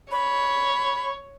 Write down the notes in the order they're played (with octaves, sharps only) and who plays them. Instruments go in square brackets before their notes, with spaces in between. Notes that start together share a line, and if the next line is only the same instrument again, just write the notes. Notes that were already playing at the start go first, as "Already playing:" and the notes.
[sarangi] C#5 [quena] B5